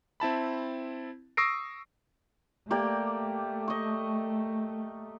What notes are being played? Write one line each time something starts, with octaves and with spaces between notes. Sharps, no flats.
C4 E4 A5 B5
C#6 D#6 E6 A#6 C7 D7
A3 A#3 G4 D5
D#5 C#6